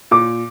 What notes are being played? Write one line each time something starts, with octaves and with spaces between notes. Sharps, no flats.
A#2 D6